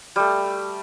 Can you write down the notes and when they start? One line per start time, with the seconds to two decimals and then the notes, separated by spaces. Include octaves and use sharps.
0.16 G3 A3